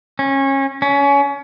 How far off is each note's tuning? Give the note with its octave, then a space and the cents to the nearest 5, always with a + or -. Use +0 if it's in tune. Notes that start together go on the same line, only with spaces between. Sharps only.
C#4 -25
C#4 +25